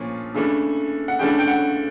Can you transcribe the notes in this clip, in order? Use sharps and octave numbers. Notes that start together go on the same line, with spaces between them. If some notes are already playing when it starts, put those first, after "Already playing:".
Already playing: A#2 F3 A#3 C#4
C#3 E3 A3 D4
F#5
C#3 E3 A3 D4 G5
G5
F#5